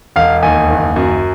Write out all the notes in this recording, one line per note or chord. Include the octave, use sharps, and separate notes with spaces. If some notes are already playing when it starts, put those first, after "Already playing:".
E1 F5
D#2 G#5
F#1
F#2